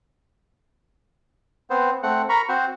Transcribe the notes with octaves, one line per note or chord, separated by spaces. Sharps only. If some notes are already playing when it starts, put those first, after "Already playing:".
B3 C4 C5
A3 C4 F#5
A#4 A#5 B5 C#6
C4 F#4 C5